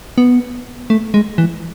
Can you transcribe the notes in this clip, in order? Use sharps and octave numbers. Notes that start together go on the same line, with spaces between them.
B3
A3
G#3
E3